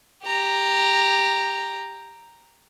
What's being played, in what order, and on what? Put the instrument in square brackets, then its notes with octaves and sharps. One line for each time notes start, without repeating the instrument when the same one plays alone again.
[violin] G4 A#5